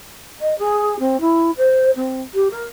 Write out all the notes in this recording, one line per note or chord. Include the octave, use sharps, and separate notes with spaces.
D#5
G#4
C4
E4
C5
C4
G4
A#4